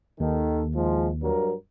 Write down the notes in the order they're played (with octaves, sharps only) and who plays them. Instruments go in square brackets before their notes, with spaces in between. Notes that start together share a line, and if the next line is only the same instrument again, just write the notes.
[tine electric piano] D#2 [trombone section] D#3 A4
[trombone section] G#1 F3 G#3
G2 F#3 A#4